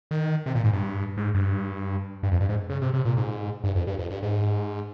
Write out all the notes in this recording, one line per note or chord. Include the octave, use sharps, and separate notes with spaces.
D#3
C3
A#2
G#2
G2
G#2
G2
G2
F2
G2
G#2
C#3
C3
C3
A#2
G#2
G2
F2
G2
F2
G2
G#2